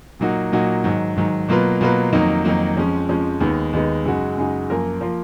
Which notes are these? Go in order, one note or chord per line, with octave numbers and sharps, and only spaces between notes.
A#2 F#3 A#3 D#4 F#4
A#2 F#3 A#3 D#4 F#4
G#2 D#3 F#3
G#2 D#3 F#3
B2 F#3 A#3 F4 B4
B2 F#3 A#3 F4 B4
F2 D#3 F#3 A#3 D#4
F2 D#3 F#3 A#3 D#4
F2 F3 G#3 C#4
F2 F3 G#3 C#4
D#2 D#3 G#3 B3 D#4
D#2 D#3 G#3 B3 D#4
F#2 C#3 G#3 D#4 F#4
F#2 C#3 G#3 D#4 F#4
F#2 F3 A#3 F4 A#4
F3 A#3 F4 A#4